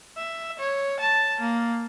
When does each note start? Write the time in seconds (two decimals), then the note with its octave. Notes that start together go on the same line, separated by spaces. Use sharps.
0.17 E5
0.59 C#5
1.00 A5
1.40 A#3